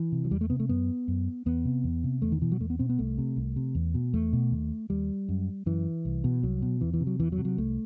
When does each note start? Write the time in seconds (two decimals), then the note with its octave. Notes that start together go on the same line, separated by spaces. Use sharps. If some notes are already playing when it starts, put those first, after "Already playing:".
Already playing: E3
0.12 C3
0.24 F#3
0.31 E2 G3
0.41 A3
0.50 C3 B3
0.60 A3
0.69 F#2 B3
1.08 F#2
1.46 E2 B3
1.65 C3
1.84 E2
2.04 C3
2.22 E2 A3
2.32 D#3
2.41 B2 E3
2.52 F#3
2.60 E2 A3
2.70 B3
2.79 B2 C4
2.89 B3
2.99 C2 A3
3.18 C3
3.37 C2
3.56 C3
3.75 E2
3.95 B2
4.13 E2 A3
4.33 B2
4.51 D#2
4.90 D#2 G3
5.29 F#2
5.66 F#2 E3
6.05 C2
6.24 B2
6.43 C2 F#3
6.62 B2
6.81 E2 E3
6.94 E3
7.00 C3
7.07 F#3
7.20 E2 E3
7.32 F#3
7.38 C3
7.45 F#3
7.58 C2 A3